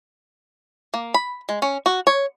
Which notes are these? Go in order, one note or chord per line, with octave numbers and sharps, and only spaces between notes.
A#3
B5
G#3
C#4
F#4
C#5